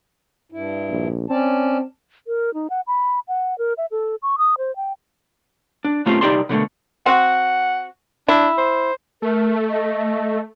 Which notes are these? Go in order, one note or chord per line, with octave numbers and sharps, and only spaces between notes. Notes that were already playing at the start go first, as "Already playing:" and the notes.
G2 E4
A#1
C4 C#4 D5 A5
A#4
D#4
F#5
B5
F#5
A#4
E5
A4
C#6
D#6
C5
G5
D4
A#2 A3 C4 C#4 F4 G4
C2 D#4 G4 D5 A5 C6
B2 D3 F#3 A3
C4 F#4 F#5
D4 E4
C5
A3 A#4
D#5